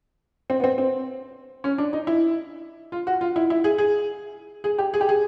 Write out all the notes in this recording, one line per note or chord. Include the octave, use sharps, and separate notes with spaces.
C4
B3
C4
C4
C#4
D4
D#4
E4
F4
F#4
F4
E4
E4
G#4
G#4
G#4
G4
G#4
G4
G#4